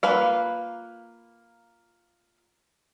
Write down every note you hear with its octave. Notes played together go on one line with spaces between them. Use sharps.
A#3 F4 B4 F5